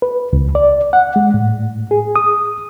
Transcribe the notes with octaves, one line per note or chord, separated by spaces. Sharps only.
B4
C#2
D5
F#5
G#3
A2
G#4
D#6